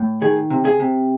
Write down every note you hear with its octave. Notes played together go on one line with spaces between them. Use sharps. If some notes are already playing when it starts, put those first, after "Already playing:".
Already playing: A2
D#3 G#4
C3
G#4
C3